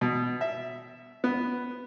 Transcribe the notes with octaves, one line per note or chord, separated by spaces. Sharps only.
B2
E5
B3